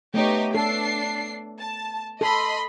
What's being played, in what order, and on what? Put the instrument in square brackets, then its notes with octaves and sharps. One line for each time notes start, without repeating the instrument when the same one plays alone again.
[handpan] A3 B3 C#5 [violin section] D#4 G4
[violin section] D4 C7 [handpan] A4
[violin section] A5
[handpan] A4 [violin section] D#5 B5 C6